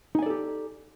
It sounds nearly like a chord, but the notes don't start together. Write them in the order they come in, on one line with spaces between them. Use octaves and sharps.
D#4 G#5 D5 A4 G4